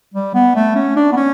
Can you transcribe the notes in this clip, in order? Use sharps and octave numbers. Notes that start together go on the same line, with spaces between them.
G3
B3
A3
C#4
D4
B3
C#4